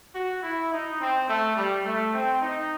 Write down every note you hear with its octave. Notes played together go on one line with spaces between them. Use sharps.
F#4
E4
D#4
C4
A3
G3
A3
C4
D#4